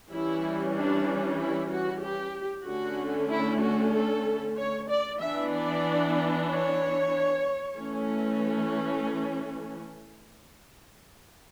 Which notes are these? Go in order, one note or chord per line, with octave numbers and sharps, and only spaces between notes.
E3 G3 C#4 E4
D4
E4
F#4
G4
D3 A3 C#4 F#4
E4
F#4
A4
C#5
D5
E3 B3 D4 E5
D5
C#5
E3 A3 C#4